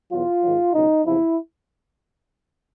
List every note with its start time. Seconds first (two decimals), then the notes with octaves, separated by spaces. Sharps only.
0.11 E2 B2 F#3 F4
0.43 G#2 D#3 F#3
0.73 C#2 B2 F#3 D#4
1.05 E2 C3 F3 E4